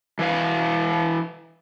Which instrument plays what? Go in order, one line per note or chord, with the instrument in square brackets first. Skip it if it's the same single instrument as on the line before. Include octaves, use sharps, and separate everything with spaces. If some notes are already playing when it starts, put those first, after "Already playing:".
[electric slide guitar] E3 B4 F5